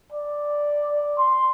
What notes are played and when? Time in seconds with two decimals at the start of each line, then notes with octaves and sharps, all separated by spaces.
0.12 D5
1.18 C6